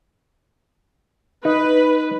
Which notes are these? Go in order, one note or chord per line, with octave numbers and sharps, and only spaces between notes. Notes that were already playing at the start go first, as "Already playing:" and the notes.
D#4 B4